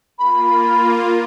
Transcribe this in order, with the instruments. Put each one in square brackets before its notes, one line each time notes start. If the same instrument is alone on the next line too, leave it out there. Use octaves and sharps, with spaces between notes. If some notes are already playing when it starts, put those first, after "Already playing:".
[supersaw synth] A#3 F4 [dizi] B5